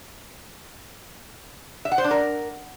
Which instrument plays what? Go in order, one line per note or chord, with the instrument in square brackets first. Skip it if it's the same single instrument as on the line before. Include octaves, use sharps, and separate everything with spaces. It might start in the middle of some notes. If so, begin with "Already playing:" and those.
[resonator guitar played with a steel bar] E5
F#5
C5
D4
A#4